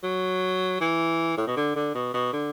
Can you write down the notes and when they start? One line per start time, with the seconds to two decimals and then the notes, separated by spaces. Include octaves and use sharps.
0.03 F#3
0.81 E3
1.37 A2
1.47 B2
1.56 D3
1.76 D3
1.95 B2
2.14 B2
2.33 D3